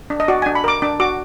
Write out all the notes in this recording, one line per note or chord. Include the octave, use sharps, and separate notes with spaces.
D4
D#5
F#4 D5
D4 G#5
B5
A#4 D6
D4 D6
F#4 D6